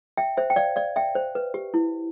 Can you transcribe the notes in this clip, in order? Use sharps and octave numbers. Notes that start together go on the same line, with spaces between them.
E5 G5
C5 E5
G5
D5 F5
D5 F5
E5 G5
C5
B4
G4
E4